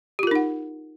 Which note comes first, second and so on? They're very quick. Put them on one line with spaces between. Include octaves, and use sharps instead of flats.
G4 F4 A#4 D#4 F#5